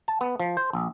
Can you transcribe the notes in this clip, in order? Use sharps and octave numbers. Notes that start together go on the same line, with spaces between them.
A5
B3
F3
C5
A#1